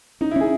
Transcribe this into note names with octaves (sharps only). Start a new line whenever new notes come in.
C#4 D#4
E4
C#4 G#4